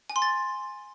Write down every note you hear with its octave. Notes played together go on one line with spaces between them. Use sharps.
G#5
C6
A6